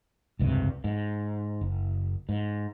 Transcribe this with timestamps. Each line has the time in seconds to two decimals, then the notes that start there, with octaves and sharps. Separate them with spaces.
0.39 F1 C#2 G2 C3
0.84 G#2
1.61 F#1
2.29 G#2